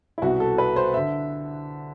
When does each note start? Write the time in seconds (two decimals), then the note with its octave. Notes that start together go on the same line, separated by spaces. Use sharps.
0.18 E4
0.22 C2 B2 F#4
0.40 A4
0.58 B4
0.76 C5
0.94 D3 E5